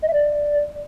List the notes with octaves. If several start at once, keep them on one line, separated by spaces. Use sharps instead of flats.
D#5
E5
D5